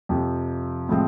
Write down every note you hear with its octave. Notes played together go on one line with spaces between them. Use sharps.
F2 C3 F3
A2 F3 G#3 C4